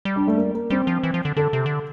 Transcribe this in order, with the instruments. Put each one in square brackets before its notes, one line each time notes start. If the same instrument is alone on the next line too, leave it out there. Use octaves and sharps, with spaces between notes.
[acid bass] G3
[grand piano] D4
A3
A#3
A#3
[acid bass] G3 [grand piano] C4
[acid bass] F3
E3
F3
D3
[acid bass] D3 [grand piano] A4
[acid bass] C3
D3